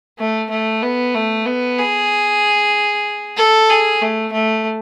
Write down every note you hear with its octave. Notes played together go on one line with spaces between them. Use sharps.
A3
A3
B3
A3
B3
G#4
A4
G#4
A3
A3